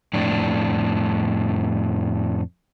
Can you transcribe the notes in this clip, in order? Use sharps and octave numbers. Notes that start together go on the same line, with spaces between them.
F2 A2 D4